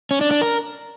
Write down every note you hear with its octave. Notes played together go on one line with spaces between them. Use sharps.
C#4
D4
D4
A#4